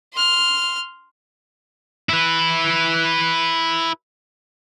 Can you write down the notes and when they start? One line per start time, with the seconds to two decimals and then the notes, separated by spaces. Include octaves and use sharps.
0.13 C6 F6
2.09 E4 B4